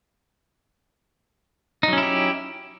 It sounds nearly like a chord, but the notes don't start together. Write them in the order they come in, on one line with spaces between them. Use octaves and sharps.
D#4 F#3 C#4 E4 G4